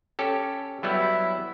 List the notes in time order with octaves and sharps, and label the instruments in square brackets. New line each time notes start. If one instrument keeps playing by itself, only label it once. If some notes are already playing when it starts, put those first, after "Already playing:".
[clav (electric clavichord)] C#4 G4 A4
[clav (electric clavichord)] F#3 G3 B3 [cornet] E4